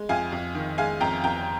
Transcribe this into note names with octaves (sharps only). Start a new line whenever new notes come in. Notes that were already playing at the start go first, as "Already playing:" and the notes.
Already playing: G#3
F2 F5 G#5
F2
D#3
G#3 F5 G#5
F2 G5 A#5
F2 G5 A#5